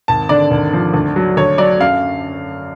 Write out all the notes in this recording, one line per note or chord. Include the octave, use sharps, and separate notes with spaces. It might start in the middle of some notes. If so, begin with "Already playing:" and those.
G#1 A5
D3 D5
G#1
F3
D2
F#3
D2 C#5
F#3 D5
F#2 F5